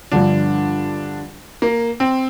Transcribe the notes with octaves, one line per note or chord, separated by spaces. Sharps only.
G2 D3 F3 D4
A#3
C4